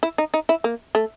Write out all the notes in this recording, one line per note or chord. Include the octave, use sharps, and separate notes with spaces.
E4
D#4
D#4
E4
A#3
A3